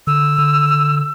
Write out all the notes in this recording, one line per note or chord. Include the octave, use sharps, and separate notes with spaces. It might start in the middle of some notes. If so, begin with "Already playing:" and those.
D3 E6
D3